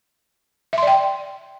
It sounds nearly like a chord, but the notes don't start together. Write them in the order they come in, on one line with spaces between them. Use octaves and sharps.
E5 C6 D5 G5